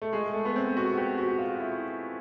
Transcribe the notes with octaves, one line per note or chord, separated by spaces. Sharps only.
A3
G#3
A3
B3
C4
F#4
G4
F#4
F4
E4